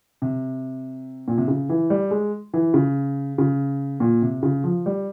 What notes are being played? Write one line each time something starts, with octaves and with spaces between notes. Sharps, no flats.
C3
A#2
C3
C#3
E3
G3
G#3
E3
C#3
C#3
A#2
C3
C#3
F3
G3